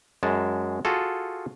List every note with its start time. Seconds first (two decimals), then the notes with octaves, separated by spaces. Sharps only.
0.23 F#2 G#3 A5
0.85 F4 F#4 G#4 A4